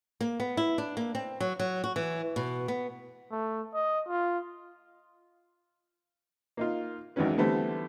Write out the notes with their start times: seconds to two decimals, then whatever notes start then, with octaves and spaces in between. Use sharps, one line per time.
0.21 A#3
0.40 B3
0.57 E4
0.78 D4
0.97 A#3
1.15 C4
1.40 F#3
1.59 F#3
1.84 F#4
1.96 E3
2.36 B2
2.68 B3
3.31 A3
3.74 D#5
4.08 F4
6.57 A#3 D#4 F4
7.16 G#1 E2 D#3 F#3 C#4 B4
7.38 D3 E3 G3 A3 B3 C4